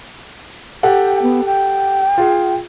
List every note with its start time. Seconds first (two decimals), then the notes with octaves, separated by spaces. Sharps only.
0.83 G4 A4 F#5 G5
1.22 B3
1.45 G5
2.18 F4 G#4